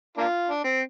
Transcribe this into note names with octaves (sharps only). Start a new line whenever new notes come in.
A#3 D4 F4
D4
C4